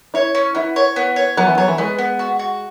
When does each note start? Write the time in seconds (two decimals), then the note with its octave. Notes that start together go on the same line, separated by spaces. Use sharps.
0.14 E4 C#5
0.35 C#4
0.55 B3 E4
0.76 C#5
0.96 B3
1.16 C#5
1.37 F#3 B3
1.47 E3
1.58 F#3 C#5
1.68 E3
1.78 G#3 B3
1.98 B3
2.19 F#4
2.39 F#4